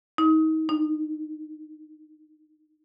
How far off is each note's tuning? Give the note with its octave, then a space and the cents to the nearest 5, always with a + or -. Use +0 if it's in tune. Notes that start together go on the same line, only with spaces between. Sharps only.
D#4 +30
D#4 -25